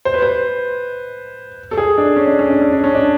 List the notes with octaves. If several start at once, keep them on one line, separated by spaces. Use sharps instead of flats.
C5
B4
C5
A4
G#4
D4
C#4
D4
C#4
D4
C#4
D4
C#4
D4